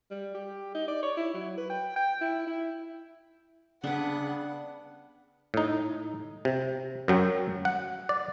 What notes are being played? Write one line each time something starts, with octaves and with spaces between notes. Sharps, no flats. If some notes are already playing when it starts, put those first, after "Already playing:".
G3
G4
D#4
D5
C#5
E4
F#3
B4
G5
G5
E4
E4
C#3 G3 B3 D4 F#5
A2 D#4
C3
F#2 F#3 G5
F#5
D5